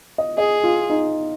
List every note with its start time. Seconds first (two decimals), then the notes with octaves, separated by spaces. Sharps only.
0.18 D#5
0.38 G#4 D#5
0.64 F4
0.90 D#4